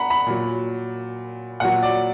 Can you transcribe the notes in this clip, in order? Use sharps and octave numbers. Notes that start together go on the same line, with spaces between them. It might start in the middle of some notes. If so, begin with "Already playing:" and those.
Already playing: F#5 A#5 B5
B5
A#2 F#3
A#2 F#3 F#5
D5